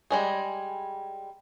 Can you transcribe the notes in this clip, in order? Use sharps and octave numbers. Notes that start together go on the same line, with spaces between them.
G3 G#3 G#4